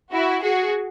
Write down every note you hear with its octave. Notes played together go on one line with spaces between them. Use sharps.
E4 F#4
F#4 G#4